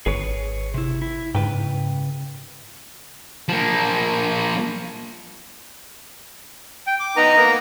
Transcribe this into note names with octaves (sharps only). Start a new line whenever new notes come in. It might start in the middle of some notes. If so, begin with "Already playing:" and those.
G#1 G#4 B4 C#5
C3 E4
E4
G#2 C#3 B4 G5
F3 A#3
G5
D6
B3 D#4 D#5 A#5
A#3 B3